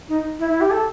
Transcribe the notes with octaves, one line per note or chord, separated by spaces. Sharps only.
D#4
E4
E4
G4
A4